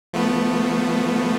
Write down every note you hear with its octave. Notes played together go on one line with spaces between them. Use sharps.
F3 A3 B3